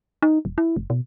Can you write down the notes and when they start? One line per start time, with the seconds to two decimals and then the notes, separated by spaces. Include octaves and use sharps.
0.22 D#4
0.45 E1
0.58 E4
0.76 F#1
0.90 B2